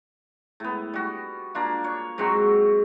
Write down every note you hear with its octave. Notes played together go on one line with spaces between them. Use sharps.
A2 B3
G3 F#4
A#3 D4 F4
C#5
G#2 F#3 C4 F#4